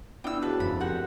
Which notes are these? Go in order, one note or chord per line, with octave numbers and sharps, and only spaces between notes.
B3 D4 E4 G5 E6
D2 C#3 F#4 B4 A5
G1 F2 B5
D3 C4 G4 A#4 F#5